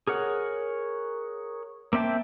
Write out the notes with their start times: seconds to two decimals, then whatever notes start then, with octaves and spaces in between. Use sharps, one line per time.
0.07 G#4 A#4 C#5 F#5
1.93 A#3 C4 E5 G5 A5